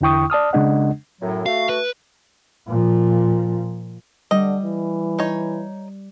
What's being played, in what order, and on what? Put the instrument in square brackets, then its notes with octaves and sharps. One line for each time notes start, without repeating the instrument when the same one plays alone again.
[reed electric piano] E2 D3 E4 G5 C#6 D#6
D5 A5 D#6 F6
C#3 G#3 D4 D#5 F#5
[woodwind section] F#2 A2 F#3
[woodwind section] A3 F#4 [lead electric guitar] F5
[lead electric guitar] B4
[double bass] A#2 F3
[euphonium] D3 [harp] G3 [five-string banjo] D#5
[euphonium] E3
[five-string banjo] D#4 C#5